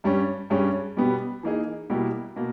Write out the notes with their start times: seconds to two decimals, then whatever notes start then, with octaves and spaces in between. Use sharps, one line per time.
0.04 G2 G3 C#4
0.50 G2 G3 C#4 G#4
0.97 B2 G3 B3 G4
1.43 E3 A#3 D#4 G#4
1.90 B2 G3 A#3 E4 G4
2.36 B2 A#3